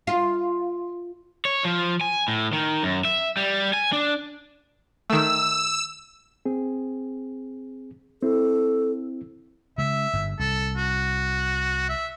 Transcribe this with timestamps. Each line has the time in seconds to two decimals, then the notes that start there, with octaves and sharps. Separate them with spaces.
0.07 F4
1.45 C#5
1.65 F3
2.01 G#5
2.28 A2
2.53 D#3
2.83 F#2
3.05 E5
3.37 G3
3.73 G#5
3.92 D4
5.10 D#3 A3 E6
6.45 C4 G#4
8.22 C4 E4 A4
9.78 C#3 G#3 E5
10.13 G1 G2
10.39 C2 A4
10.77 F#4
11.89 E5